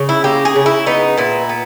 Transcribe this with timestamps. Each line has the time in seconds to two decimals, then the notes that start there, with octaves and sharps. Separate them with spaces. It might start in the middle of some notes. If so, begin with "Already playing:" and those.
Already playing: C#3
0.09 E4
0.24 A#3 G4
0.45 G#4
0.56 C#3
0.66 E4
0.86 B3 D#4
1.17 A#2 E4
1.49 B3